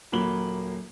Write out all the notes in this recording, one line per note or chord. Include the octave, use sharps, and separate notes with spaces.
D#1 F#3 A#3 B5 F#7 G7